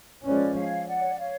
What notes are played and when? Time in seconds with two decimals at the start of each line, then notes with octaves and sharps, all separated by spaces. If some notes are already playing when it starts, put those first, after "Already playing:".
0.24 F3 G#3 C#4 B4 D5
0.56 C#5 F5
0.87 D5 F#5
0.99 C#5
1.08 D5
1.19 C#5 F5